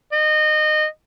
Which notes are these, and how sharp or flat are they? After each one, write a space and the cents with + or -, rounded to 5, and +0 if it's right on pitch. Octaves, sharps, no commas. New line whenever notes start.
D#5 -25